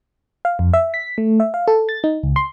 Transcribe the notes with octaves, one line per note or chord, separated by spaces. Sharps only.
F5
F2
E5
B6
A3
E5
F5
A4
A6
D#4
C#2
C6